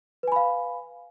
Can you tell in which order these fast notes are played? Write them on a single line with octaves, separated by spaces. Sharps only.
B4 G#5 B5 F5